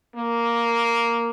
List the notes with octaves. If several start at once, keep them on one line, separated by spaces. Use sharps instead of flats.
A#3